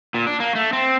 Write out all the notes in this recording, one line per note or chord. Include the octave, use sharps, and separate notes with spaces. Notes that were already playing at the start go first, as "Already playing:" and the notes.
A#2
D4
A#3
A3
C4